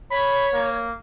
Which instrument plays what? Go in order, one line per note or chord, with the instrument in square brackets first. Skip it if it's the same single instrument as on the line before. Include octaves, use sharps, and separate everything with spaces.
[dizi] C#5 [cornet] B5
[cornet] A#3